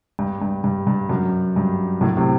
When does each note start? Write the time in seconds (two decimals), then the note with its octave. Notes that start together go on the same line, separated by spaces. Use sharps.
0.19 G2
0.42 G2
0.64 G2
0.87 G2
1.09 F#2
1.56 G2
2.01 F#2 A2
2.17 A2 C3